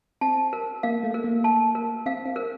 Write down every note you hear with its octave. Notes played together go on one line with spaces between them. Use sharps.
C4 A5
A#4
A#3 F5
A3
A#4
A#3
A5
A#4
C4 F5
C4
A#4